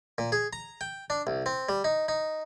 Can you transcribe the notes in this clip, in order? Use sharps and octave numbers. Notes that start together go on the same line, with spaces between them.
A#2
G#4
A#5
G5
D4
C2
C4
G3
D#4
D#4